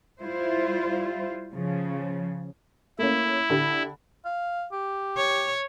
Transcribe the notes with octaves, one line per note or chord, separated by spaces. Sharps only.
G3 E4 F4 C5
C#3 F3
A3 A#3 C#4 E4
D3 G4 B5
F5
G4
C#5